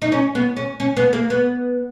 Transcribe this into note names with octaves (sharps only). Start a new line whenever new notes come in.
D#4
C#4
B3
C#4
C#4
B3
A#3
B3